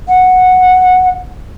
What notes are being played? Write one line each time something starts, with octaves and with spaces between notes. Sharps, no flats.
F#5